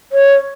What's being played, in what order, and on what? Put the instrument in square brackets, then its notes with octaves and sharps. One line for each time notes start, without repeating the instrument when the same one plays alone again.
[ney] C#5